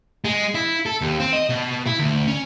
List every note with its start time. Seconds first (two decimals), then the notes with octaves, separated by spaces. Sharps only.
0.25 G#3
0.55 E4
0.86 A4
1.01 D#2
1.20 C4
1.33 D#5
1.49 B2
1.86 E4
1.99 D2
2.27 C#4